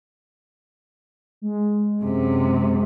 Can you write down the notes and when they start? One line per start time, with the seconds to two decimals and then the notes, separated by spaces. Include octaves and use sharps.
1.42 G#3
2.04 F#2 C3